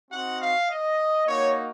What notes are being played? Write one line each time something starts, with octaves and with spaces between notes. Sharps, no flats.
C4 D#4 F#4 F#5
F5
D#5
A#3 D#4 F#4 C#5